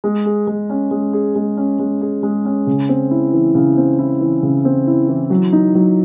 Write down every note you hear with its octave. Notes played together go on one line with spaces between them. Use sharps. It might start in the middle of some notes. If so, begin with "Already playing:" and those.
G#3
G#4
G#3
C#4
G#3
G#4
G#3
C#4
G#3
G#4
G#3
C#4
C#3
C4
E4
E3
C#3
C4
E4
E3
C#3
C4
E4
E3
F#3
D#4
F#3